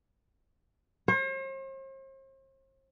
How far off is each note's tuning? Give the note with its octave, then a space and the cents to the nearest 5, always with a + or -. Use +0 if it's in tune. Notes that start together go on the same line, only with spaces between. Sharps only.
C5 +45